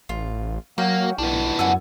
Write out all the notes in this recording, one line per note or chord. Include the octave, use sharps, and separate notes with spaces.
A1 F4
F#3 A#3 C#4 F#5 G5
B1 B3 D4 E4
F#2 F#5 G#5 E6